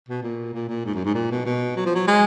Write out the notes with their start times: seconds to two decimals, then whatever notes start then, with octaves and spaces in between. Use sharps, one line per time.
0.08 B2
0.23 A#2
0.54 A#2
0.69 A#2
0.85 G#2
0.95 F#2
1.05 G#2
1.15 A#2
1.31 B2
1.46 B2
1.76 F#3
1.86 F3
1.95 F#3
2.07 G#3